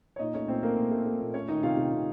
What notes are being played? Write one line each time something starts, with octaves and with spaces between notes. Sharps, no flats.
C#5
A#2 D#4 D#5
A3 C#4 C#5
A#2 C4 C5
A3 A#3 A#4
A#2
A3
A3
A#2
A3 C#4 C#5
D#3 D#4 D#5
C3 F4 F5
C3
C3